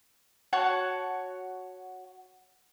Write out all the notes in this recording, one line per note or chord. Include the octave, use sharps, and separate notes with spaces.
F#4 C#5 F#5 A5